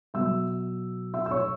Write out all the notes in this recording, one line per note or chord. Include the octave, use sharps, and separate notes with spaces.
B2 F#3 E5 E6
E5 E6
E6
C#5 C#6